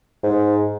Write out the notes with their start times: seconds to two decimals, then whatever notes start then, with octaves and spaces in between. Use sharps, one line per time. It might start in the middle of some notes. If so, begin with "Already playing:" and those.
0.24 G#2